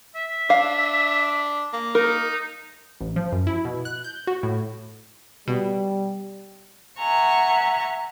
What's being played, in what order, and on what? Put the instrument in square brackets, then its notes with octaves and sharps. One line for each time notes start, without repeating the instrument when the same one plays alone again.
[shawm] E5
[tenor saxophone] D4 [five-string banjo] F5
[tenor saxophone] A#3
[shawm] D#4 [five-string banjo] A#4
[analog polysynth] A1
F3
F#2
E4
B2
F#6
G6
F#4
A2
[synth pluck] B2 [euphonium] G3
[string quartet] E5 F#5 G#5 A#5 C#6